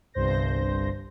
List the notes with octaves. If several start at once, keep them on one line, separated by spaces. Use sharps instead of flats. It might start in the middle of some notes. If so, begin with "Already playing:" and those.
G1 C2 G2 C5 G6 A#6